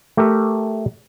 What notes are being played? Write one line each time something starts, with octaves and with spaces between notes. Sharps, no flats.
A3 G4 A#4 E5